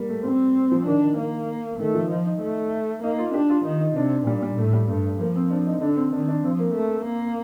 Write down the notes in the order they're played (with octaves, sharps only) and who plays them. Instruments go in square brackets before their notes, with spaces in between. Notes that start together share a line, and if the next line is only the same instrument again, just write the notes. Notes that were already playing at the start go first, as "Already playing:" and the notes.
Already playing: [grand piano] G3 A#3
A3
[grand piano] G3 [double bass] C4
[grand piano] F3
[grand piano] D#3 [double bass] D4
[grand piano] D#3
[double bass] A#3
[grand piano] D#3 [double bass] A3
[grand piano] F3
[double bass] F3 [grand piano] D#4
[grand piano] D#4
[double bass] A3
[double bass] A#3 [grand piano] D#4
[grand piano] F4
[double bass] D4 [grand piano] G4
[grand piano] F4
[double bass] D#3 [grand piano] D#4
[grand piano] D#4
[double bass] C3 [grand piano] D4
[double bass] A#2 [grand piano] G3
[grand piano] G3
[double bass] A2 [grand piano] A3
[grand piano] G3
[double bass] G2 [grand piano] A3
[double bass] F3 [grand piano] A#3
[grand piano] C4
D4
D#4
[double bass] D3 [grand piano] D4
[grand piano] C4
[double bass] D#3 [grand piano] D4
[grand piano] D4
[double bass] F3 [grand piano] C4
[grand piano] A#3
[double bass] A3
A#3